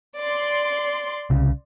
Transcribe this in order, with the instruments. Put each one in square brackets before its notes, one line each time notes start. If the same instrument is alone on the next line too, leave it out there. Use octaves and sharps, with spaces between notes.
[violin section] D5 C6
[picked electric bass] C2 C#3